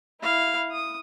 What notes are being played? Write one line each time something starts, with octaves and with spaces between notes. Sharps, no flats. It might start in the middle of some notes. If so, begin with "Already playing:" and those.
E4 F5
D#6